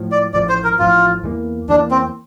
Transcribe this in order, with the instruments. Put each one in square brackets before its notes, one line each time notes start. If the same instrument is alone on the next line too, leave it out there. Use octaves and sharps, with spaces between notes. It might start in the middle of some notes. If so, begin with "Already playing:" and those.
Already playing: [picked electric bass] A2 F3
[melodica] D5
[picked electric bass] A1 A2 F3 [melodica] D5
[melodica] C5
A#4
[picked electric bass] A1 A2 F3 [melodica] F4
[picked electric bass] E2 E3 G3 A#3
[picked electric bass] E2 E3 G3 A#3 [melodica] D4
[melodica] C4